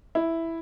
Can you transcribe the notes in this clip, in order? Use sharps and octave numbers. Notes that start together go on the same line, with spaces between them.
E4